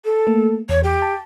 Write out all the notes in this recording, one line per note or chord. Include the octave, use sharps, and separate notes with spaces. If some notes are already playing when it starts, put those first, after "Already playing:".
A4
A3 A#3
E2 C#5
G4
A5